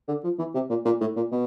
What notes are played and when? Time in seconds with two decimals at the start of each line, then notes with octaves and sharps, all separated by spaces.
0.08 D3
0.24 F3
0.39 E3
0.54 C3
0.69 A#2
0.85 A#2
1.01 A2
1.16 A#2
1.32 B2